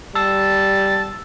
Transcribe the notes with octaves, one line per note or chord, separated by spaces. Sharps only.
G3 A5 E6 A6 C7